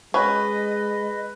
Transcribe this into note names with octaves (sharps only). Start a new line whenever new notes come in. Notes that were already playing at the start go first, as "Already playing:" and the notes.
G#3 C#4 B4 D#5